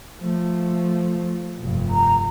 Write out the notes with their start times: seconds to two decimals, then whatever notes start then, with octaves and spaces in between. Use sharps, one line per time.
0.18 F3 A3
1.59 F1 G2
1.90 A#5